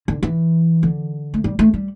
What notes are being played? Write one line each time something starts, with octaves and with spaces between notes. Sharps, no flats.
D3
E3
D3
A3
G3
A3
G3